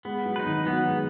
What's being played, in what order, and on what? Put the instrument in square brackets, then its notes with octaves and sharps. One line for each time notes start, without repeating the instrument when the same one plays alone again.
[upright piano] G#3 [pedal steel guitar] B3
[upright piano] F#3
[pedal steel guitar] D#4 B4
[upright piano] D#3
[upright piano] F#3 [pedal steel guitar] B3
[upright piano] G#3